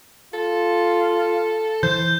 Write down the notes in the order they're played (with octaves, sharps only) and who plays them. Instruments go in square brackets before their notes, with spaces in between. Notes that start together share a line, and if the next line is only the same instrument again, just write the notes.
[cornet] F4 [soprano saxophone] A4
[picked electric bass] E3 [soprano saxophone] C5 [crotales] G6